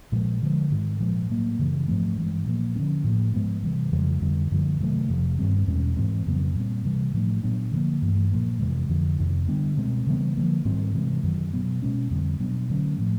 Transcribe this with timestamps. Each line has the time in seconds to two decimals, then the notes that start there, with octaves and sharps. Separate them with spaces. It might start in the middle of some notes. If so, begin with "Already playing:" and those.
0.12 A#2 F3 G#3
0.42 D3 F3 G#3
0.71 G#2 D#3 G#3
1.00 A#2 F3 G#3
1.30 A2 F#3 A#3
1.59 F#2 C#3 E3
1.88 G#2 F3 A3 C4
2.16 G2 E3 G#3
2.45 A#2 F3 A#3
2.75 D3 F3 A#3 C#4
3.04 A2 F3 A#3
3.34 G#2 F3 G#3 B3
3.63 C3 E3 G3
3.92 F2 C#3 F3 G#3
4.22 F2 D3 G3
4.51 F#2 D3 F3
4.80 C3 D#3 F#3 A3
5.09 F2 C3 F3
5.39 G2 D#3 G3 C4
5.67 E2 B2 G#3 C#4
5.97 G#2 E3 G#3 C4
6.26 F2 C#3 F#3 B3
6.55 A#2 G3 C4
6.85 C3 E3 G3
7.14 A2 F3 A3 D4
7.43 A#2 F#3 B3 D4
7.72 D3 F3 A#3
8.02 G2 E3 A3
8.31 A#2 F3 A#3
8.60 F2 C3 E3 G#3
8.89 F2 D3 F3
9.18 F2 C3 D#3
9.48 D3 G3 B3 D4
9.77 B2 G#3 C4
10.07 C#3 E3 G3 B3
10.35 D3 F3 A#3
10.65 G#2 D#3 G3 C4
10.94 C3 E3 G#3
11.23 F#2 D#3 F#3
11.53 B2 F#3 B3
11.82 B2 G#3 C#4
12.11 F2 D3 G3 C4
12.40 B2 F#3 B3 D4
12.70 D3 F#3 A3 C#4
12.98 A2 F3 A3